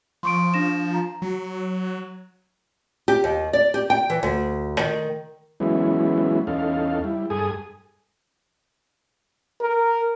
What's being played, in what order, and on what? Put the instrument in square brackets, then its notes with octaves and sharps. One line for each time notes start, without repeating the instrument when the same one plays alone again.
[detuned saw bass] F3 [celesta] C6 C#6 D7
[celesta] D4 A#6 E7
A#5
[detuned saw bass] F#3
[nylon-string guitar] G4
D#2
D5
G4
G5
E3
D2
D#3
[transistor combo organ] E3 F#3 G#3 B3 C#4 E4
E2 C#4 D#4 A4 F5
G3 E4
G2 G#4 A4 G#5 D#6
[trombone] A#4